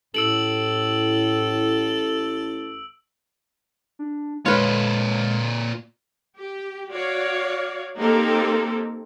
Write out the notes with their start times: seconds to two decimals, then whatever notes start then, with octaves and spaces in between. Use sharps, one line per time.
0.14 A1 A2 A4 E6 D7 F#7
3.99 D4
4.46 A#2 G#3 F4 B4 C#5
6.37 G4
6.92 F#4 C#5 D5 F5
7.98 A#3 C4 D#4 G4 A4